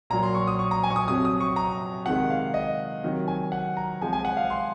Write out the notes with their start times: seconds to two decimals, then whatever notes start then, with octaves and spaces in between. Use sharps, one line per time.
0.10 A#2 F#3 A#5
0.23 C6
0.35 C#6
0.47 D#6
0.59 C#6
0.71 A#5
0.83 G#5
0.90 C#6
0.96 D#6
1.08 F2 C3 F#3 D#6
1.25 D#6
1.40 C#6
1.56 A#5
2.06 C3 D#3 G#3 F#5
2.30 F5
2.54 D#5
3.03 C3 D#3 F#3
3.28 G#5
3.52 F#5
3.77 A#5
4.01 C3 F3 G#3 G#5
4.13 G#5
4.25 F#5
4.37 F5
4.50 C6